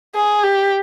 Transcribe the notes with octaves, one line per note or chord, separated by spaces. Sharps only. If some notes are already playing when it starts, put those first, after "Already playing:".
G#4
G4